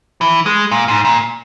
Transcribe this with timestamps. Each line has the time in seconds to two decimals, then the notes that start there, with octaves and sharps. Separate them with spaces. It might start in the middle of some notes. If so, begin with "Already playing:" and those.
0.21 E3
0.46 G#3
0.71 A#2
0.88 G#2
1.05 A#2